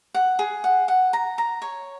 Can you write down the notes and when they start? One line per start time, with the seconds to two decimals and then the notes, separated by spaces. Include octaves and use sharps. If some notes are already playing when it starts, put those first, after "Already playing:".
0.14 F#5
0.39 G#4
0.64 F#5
0.88 F#5
1.13 A#5
1.38 A#5
1.62 C#5